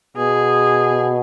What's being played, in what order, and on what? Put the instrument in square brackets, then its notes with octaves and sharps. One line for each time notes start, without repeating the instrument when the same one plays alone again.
[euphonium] B2 [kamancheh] G#4